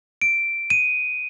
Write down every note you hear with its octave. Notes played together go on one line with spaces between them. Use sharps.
D7
D#7